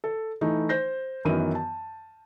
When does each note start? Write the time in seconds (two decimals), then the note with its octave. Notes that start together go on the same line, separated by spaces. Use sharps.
0.04 A4
0.41 E3 A3 D#4
0.69 C5 G6 A#6
1.25 F#2 D#3 E3 B3 A#4 D#7
1.55 A5